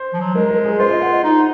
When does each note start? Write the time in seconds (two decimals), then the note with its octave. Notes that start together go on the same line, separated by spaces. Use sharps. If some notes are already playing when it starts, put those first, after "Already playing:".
Already playing: C5
0.13 F3
0.21 F#3
0.35 G#3 A#4
0.50 A#4
0.64 G#4
0.79 F4 C5
0.91 D#5
1.02 F#5
1.13 D#5
1.24 D#4